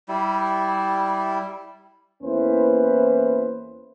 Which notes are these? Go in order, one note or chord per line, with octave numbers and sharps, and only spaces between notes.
G3 E4
E2 A#3 C#4 E4 B4 C5